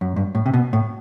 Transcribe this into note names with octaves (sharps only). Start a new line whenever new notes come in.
F#2
G2
A2
C3
B2
A2